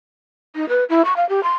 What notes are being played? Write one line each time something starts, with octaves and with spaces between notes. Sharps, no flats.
D#4
B4
E4
C#6
F5
G4
C6